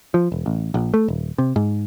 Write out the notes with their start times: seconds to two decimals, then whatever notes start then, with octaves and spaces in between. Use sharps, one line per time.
0.14 F3
0.32 E1
0.46 A1
0.74 A#1
0.94 A3
1.08 D#1
1.38 C3
1.56 G#2